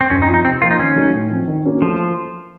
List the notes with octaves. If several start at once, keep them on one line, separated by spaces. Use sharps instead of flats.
C4
F#2 C#4
D#4
F3 C4 F4
D#4
C3 C4
F3 A#3 F4
D#4
D#3 C#4
F#3 A3 D#4
A2
F3 C4
D#3
A#3 C#4 F#4
F3 A3